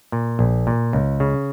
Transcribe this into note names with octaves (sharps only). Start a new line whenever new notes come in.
A#2
A#1
A#2
C#2
C#3